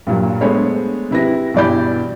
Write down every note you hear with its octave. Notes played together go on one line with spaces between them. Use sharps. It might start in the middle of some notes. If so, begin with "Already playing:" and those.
G2 A#2 F#3
G#3 A3 B3 D4 C5 C#5
C3 E4 B4 A#6
G2 B2 E3 D5 B5 G6